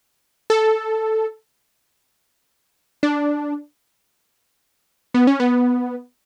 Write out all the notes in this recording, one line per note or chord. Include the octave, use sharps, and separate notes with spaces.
A4
D4
B3
C#4
B3